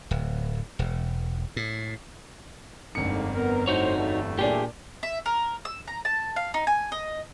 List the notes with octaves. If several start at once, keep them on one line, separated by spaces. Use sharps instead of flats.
D1
E1
A2
G1 F2 G#2 D3 A#3 C#7
B3 A#4
A2 D#4 F#4 C5 C#5
E2 G2 A3
A#2 D4 G4 G#4
E5
A#4
E6
A#5
A5
F5
D#4
G#5
D#5